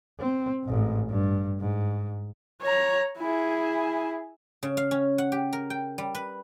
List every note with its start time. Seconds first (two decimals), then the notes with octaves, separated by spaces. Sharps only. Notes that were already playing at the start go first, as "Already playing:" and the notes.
0.19 C4
0.64 A1 G#2
1.10 G2
1.60 G#2
2.62 C#5 A#5
3.18 E4 G#4
4.63 C#3
4.77 F5
4.91 C#4
5.18 F#5
5.32 G4
5.53 A#4
5.70 G5
5.98 G3
6.15 B4